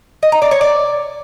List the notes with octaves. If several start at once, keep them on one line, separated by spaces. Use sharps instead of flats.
D#5
A#5
D5
C#5
D5